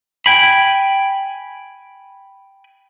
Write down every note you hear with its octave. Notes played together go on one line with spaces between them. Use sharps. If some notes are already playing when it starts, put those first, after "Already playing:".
G5 G#5 B5